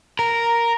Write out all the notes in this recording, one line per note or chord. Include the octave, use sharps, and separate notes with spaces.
A#4